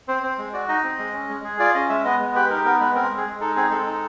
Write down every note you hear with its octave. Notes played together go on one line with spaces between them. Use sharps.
C4 C5
C4 C5
G#3
F#4 D5
D#4 D#5
C4
G#3
C#4
G#3
G#4
F4 D5
C#4 D#5
G#3 E5
B3 D#5
G#3
G4 B4
D#4 A#4
B3 A#4
G#3 B4
C4 A#4
G#3
G#4
G#3
D#4 A4
C4 G#4
G#3 A4
D#4